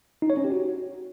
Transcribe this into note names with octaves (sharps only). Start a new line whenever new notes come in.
D#4
C#5
C#4
G4
F#4